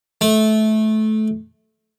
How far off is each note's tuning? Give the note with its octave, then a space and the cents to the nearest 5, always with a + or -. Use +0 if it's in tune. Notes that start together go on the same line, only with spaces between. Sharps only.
A3 -20